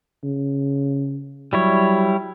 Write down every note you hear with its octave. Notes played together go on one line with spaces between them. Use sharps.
C#3
F#3 G3 E4 C#5